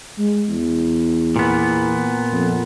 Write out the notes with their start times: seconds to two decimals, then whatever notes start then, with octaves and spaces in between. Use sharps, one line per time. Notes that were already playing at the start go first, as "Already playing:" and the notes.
0.18 G#3
0.49 E2
1.36 A#2 B3
2.32 F2